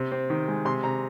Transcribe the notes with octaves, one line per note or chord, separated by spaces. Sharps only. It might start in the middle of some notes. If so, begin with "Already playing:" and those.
Already playing: C3 C4
C4
D#3
G#3
C3 C6
C3 A#5